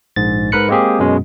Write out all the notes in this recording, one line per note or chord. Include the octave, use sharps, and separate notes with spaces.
A#1 G#2 A6
G#2 A#4 B4 B5 F#6 C#7
G#3 A#3 C4 G4 G#4
F#2 B2 G#3 C#4